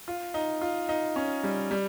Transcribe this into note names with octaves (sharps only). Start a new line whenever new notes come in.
F4
D#4
F4
D#4
C#4
G3
G3